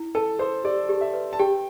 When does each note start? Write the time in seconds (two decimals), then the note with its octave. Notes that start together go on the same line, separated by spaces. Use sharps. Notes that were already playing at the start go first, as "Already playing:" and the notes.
Already playing: E4
0.15 A4 A5
0.39 A4 C5
0.64 G4 D5
0.89 G4
1.01 E5
1.14 B4
1.33 A5
1.39 G4 G5